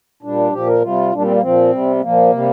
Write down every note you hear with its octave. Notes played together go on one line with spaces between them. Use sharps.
A#2 G3 D4
A#2 F3 G4
A#4
C3 G3 F4
A#2 G3 D4
C4
A#3
A#2 F3 C4
C3 G3
C4
A#2 F3 A#3
C3 G3